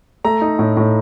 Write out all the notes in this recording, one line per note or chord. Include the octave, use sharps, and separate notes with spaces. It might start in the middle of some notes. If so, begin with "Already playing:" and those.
A3 A#5
D#4
A2
A2